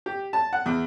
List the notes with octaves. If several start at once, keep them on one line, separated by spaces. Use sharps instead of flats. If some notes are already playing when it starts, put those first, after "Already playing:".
G4
A5
F#5
E2